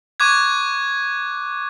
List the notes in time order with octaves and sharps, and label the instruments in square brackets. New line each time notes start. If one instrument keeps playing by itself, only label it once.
[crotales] C#6 D6 F#6 G#6